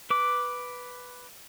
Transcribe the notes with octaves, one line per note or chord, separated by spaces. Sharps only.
B4 D6